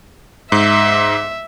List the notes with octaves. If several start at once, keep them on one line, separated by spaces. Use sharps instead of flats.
G#2 E5